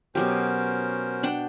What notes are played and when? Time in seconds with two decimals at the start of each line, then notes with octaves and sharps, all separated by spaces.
0.15 B2 F#3 C#4 G4 A#4 C5
1.23 D4 F#5 G5